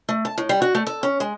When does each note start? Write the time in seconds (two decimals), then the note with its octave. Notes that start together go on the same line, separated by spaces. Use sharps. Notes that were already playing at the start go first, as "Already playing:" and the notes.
0.09 A3
0.25 A5
0.38 A2
0.49 G3
0.62 F#4
0.75 A3
0.87 A4
1.03 C#4
1.20 G#3